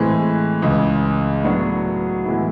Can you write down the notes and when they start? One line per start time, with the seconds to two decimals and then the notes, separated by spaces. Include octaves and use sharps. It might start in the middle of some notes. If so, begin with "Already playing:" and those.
Already playing: A2 E3 G#3 C4
0.62 C#2 C#3 E3
1.44 A2 F#3 B3 D4 F#4
2.25 A2 E3 G#3 B3 E4